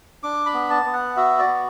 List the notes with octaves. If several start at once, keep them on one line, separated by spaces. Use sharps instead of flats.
D4 D6
B5
B3
A5
B3
F#5
F#4 E5
D5
B3